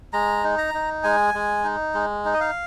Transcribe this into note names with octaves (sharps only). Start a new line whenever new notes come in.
G#3 A#5
D#4
A#5
D#4
G#3 G#5
G#3
D#4
G#3
D#4
D#5
F5